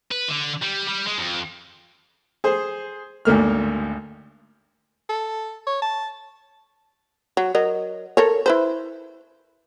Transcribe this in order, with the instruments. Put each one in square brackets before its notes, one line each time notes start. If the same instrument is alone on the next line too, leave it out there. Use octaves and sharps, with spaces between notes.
[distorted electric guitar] B4
D3
G3
G3
G#3
F2
[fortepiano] G#4 C5
G#1 D2 A#3 F6
[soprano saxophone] A4
C#5
A5
[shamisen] F#3
F#3 A#4 D#5
A4 A#4 C#5
E4 B4 C5